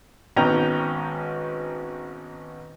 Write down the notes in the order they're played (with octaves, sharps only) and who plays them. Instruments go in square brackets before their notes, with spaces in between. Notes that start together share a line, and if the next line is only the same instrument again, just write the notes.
[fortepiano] G#1 G#2 B3 C#4 G5 A#5